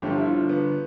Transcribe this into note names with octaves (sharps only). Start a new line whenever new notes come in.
G1 G2 D3 F3 G4
F4
E4
F4
B3